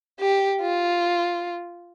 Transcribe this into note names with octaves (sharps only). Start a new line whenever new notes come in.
G4
F4